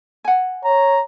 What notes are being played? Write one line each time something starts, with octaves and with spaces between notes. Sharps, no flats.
F#5 G#5
C#5 A#5